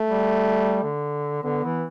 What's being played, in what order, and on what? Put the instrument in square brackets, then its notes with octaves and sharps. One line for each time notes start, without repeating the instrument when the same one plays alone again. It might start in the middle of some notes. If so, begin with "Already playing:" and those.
Already playing: [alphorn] A3
[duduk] G3
D3
[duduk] D3 [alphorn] B3
[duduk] E3